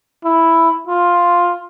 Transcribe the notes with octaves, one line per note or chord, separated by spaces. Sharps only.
E4
F4